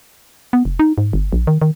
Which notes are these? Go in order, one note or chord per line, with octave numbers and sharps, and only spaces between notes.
B3
F1
D#4
G#2
G1
A#1
D#3
D#3